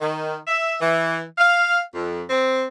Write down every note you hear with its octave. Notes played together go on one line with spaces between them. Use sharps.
D#3
E5
E3
F5
F2
C4